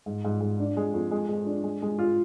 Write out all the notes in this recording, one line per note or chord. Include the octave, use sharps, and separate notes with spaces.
G#2
G#2
G#2
D4
G#3
F2
G#3
G#3
D4
G#3
G#3
F4